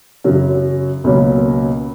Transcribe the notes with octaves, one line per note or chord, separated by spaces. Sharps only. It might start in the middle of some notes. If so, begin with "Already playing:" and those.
F#2 C#3 F#3 C#4
C#2 B2 F#3 A#3 C#4